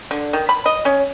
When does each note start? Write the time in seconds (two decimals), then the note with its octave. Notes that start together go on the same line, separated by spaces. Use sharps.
0.11 D3
0.33 D#3
0.49 B5
0.66 D#5
0.85 C#4